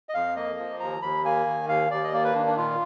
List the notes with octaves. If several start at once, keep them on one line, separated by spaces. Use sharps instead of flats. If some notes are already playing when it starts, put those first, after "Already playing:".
D#5
F2 F5
A#3 D#5
F3
D#2 A#5
D#2 B5
A#3 G#5
D#3
D#2 F5
D#2 D5
D#5
A#3 D5
B4
D#3 D4
D4
A#2 F4